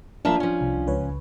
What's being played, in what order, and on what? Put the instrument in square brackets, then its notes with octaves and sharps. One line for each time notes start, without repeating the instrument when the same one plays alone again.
[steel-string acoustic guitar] F3 A#3 E5 [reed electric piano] D4 F4
[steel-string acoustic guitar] F3 C#4
[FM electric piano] C2
C#2 B4 C#5